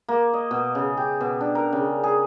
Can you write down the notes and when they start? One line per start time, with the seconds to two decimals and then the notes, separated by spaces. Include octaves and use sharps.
0.09 A#3
0.34 D#5
0.51 B2
0.75 C#3
0.97 G4
1.21 B2
1.41 D4
1.55 A#4
1.73 C#3
2.04 G#4